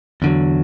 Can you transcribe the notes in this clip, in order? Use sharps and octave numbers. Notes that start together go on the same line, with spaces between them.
E2 D3 F#3